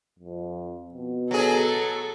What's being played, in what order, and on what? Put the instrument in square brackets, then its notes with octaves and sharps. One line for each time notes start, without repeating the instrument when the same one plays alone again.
[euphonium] F2
B2
[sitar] F#3 G#4 [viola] A4